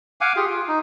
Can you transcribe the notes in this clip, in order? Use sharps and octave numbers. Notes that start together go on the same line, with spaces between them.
F5 F#5 G#5 D6
F4 G4 G#4
F4
D#4